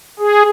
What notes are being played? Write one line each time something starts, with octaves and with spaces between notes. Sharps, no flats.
G#4